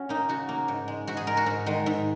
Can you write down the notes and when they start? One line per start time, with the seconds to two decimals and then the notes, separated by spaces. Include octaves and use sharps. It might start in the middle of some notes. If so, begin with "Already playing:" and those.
Already playing: C#4 F#4
0.09 A#3 D#4
0.29 C#3 F#4
0.49 A#3
0.68 G#2
0.88 G#3
1.07 G#2 F#4
1.17 G#4
1.27 G#3 A#4
1.37 F#4
1.46 G#2
1.66 D#3 G#3
1.86 G#2